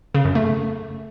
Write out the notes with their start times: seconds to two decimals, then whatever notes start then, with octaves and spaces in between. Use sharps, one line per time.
0.14 C#3
0.25 F#2
0.35 A3